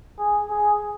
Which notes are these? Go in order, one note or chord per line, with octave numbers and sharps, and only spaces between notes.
G#4
G#4